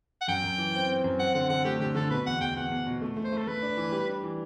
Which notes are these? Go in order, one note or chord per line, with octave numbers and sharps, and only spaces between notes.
F#5
F#2 G5
F#2
E3
C4
C4
F#2
C4 F#5
D3 F#5
D3 F#5
A3 G4
D3 G4
D3 A4
B2 B4
E2 F#5
E2 G5
E2 F#5
E2
B2
A3
A3
C5
A3
A4
A3 B4
D4
E3
G3
D4
E3